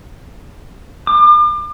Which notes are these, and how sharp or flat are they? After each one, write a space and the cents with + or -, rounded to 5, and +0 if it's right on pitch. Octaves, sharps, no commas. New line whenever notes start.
D6 +40